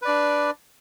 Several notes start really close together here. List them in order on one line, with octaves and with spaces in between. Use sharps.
B4 D5 D4